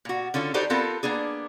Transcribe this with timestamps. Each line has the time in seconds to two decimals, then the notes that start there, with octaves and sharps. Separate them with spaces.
0.05 A#2 F#4
0.34 D3 C#4 F4 A4
0.54 D#4 F#4 G4 A4 C5 D5
0.70 B3 C4 F4 A4 A#4
1.03 A#3 B3 D4 G#4